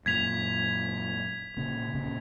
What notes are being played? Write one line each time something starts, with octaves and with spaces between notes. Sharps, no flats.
F#2 A#2 G#6 B6 F7
A#2 C#3
A#2 C#3